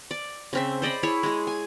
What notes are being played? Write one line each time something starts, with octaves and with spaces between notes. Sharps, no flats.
D5
C#3 C4 E5
C5 D5 D#5 B5
E4 G#4 C#5
G#3 G#4
G#5